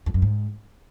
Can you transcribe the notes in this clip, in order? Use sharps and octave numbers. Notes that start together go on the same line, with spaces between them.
F2
F#2
G#2